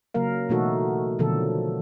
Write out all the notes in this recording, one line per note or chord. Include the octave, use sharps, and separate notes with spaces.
C#3 F#3 A#3 A#4 F5
B2 E3 A3 D#4 F#4 A4
B2 D3 D#3 F3 F#3 A4